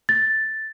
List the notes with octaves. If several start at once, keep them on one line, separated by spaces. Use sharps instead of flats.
A6